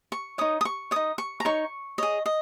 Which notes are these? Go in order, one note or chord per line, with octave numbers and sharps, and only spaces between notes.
C#6
D#4 C#5 D#6
D#6
C#6
D#4 C#5 D#6
C#6
A#5
D#4 C#5 C#6
G#4 C#5 D#5
D#5